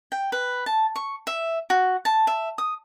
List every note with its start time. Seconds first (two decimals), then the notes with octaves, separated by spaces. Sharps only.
0.12 G5
0.32 B4
0.66 A5
0.96 C#6
1.27 E5
1.70 F#4
2.05 A5
2.27 E5
2.58 D#6